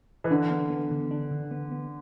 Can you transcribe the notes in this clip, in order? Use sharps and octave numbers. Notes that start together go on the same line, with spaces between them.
E3
D3 D4
B3
B3
D3
D4
D3
B3
B3